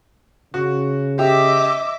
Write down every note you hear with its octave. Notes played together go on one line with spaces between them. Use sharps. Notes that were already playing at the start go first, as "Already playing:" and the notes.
C#3 F#4
G4 D#5 E5 D6